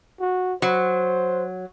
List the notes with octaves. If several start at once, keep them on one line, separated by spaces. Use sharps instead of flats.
F#4
F#3 C5